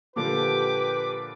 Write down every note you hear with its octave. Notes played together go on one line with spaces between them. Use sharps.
A#2 D3 F3 G4 B4 D6